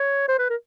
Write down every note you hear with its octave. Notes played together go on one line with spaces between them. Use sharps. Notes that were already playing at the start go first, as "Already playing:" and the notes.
Already playing: C#5
C5
B4
A#4